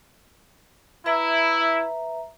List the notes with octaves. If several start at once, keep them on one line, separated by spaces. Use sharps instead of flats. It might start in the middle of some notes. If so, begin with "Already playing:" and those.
E4 B4 E5 A#5